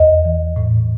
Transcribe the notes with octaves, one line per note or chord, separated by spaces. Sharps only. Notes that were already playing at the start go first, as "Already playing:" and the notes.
Already playing: E2 D#5
E3
A2